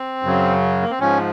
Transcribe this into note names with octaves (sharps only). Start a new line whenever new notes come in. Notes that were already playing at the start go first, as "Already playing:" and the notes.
Already playing: C4
F#2 C#3 F#3
A#3
C4
G#2 F3 C#4